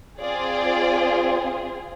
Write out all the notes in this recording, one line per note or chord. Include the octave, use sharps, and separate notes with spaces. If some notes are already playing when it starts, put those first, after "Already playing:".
C4 F4 G#4 D5